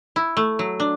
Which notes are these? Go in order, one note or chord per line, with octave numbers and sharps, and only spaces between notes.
E4
A3
F#3
D4